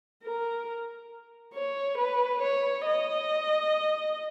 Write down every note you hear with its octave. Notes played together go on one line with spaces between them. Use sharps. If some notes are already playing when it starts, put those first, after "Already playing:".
A#4
C#5
B4
C#5
D#5